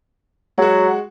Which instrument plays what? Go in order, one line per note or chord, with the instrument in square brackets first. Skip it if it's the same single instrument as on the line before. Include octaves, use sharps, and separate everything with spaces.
[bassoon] F#3 [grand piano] G#3 F#4